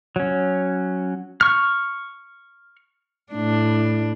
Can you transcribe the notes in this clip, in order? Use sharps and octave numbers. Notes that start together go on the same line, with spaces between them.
F#3 C#4
C#6 F6
A2 D4